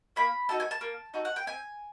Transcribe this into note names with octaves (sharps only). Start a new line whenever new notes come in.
A#3 B5
D#4 F#4 A4 A5
G#5
A5
A#3
D#4 F#4 A4
F#5
G5
C4 G#5